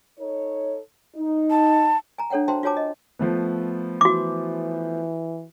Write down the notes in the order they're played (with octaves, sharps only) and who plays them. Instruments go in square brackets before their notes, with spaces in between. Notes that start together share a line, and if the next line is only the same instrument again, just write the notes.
[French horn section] D#4 A4 C#5
D#4
[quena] A5
[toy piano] G#5 A#5
D4 A4 C#5 F#5 G5
F#4 C5 E5 G5 A5 C6
F4 F#4 C#5 G#5 A5 D6
D#5
[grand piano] F3 A3 B3
[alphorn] E3 [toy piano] F#4 D6